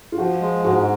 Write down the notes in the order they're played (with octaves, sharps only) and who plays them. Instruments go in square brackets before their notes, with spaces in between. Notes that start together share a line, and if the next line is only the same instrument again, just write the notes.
[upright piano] F4
[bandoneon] F3 [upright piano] F#4
[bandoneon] G#3
[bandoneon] G#2 [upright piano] F#4